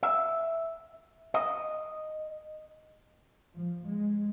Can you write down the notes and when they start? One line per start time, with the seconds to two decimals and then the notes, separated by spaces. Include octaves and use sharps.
0.03 E5
1.34 D#5
3.55 F3
3.85 G#3